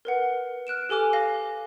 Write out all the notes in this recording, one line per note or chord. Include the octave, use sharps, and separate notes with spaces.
A#4 B4 F#5
F6 F#6 D7 E7
G4 A4 G#5 D6 F6
F5 A#6 G7